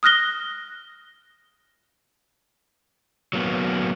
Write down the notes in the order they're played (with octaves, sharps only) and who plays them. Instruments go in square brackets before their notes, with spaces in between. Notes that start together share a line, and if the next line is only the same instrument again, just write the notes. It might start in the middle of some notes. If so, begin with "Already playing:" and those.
[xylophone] D#6 F6 F#6 A#6 G7
[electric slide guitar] F#3 A#3 B3